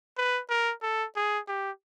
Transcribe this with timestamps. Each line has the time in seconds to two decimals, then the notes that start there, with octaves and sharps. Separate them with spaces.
0.18 B4
0.50 A#4
0.82 A4
1.16 G#4
1.48 G4